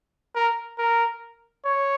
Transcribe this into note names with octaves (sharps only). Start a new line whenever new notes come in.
A#4
A#4
C#5